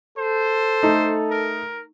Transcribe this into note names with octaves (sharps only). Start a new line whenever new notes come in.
A4 C5
A3 D#4
A#4